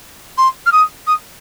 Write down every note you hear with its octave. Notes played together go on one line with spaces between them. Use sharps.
C6
F6
D#6
D#6